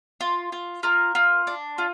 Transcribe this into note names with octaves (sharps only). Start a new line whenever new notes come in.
F4
F4
F4 A#4
F4
D4
F4